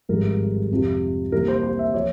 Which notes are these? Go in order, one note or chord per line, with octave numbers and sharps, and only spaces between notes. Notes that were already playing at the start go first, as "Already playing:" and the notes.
G#1 G2 F3 G#3 A#4
F2 C3 F3
C2 C3 E3 A#3 A#4
C5
C5
E5
F3 C#5